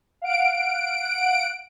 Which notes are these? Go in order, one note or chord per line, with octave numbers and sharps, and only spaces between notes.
F5 F#5 D7